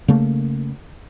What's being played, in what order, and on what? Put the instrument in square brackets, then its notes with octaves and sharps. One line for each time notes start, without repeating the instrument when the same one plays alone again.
[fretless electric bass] C#3 A3 A#3